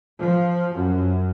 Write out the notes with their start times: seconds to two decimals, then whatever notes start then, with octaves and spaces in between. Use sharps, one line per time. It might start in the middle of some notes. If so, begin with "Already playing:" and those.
0.20 F3
0.75 F#2